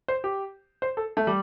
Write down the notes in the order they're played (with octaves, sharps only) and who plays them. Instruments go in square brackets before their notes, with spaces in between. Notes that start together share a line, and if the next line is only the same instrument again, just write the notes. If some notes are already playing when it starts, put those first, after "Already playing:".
[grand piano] C5
G4
C5
A4
A3
G3